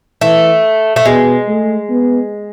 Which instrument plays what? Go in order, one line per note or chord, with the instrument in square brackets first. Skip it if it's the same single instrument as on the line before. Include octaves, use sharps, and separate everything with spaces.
[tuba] E3 [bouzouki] A3
[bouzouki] A3
[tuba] B2 [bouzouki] G#3
[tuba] A3
B3